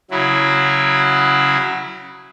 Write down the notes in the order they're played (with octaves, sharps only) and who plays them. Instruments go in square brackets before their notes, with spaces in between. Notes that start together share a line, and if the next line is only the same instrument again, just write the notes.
[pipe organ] C#3 F#3 E4